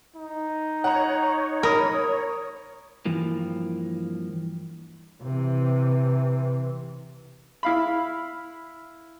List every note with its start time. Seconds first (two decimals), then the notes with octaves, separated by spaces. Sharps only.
0.16 D#4
0.84 C#5 F#5 A#5
1.63 A#4 B5 D#6
3.05 G2 E3 F3 A#3
5.23 C3 E3
7.63 E4 F5 B5